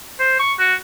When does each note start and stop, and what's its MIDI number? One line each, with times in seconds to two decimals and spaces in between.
0.19 0.35 72
0.39 0.53 85
0.59 0.74 66